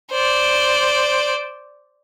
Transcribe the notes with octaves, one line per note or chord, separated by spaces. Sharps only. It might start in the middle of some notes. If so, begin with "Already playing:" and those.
C5 D5